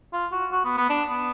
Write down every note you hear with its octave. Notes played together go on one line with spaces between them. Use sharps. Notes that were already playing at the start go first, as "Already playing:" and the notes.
F4
F#4
F#4
B3
B3
D4
B3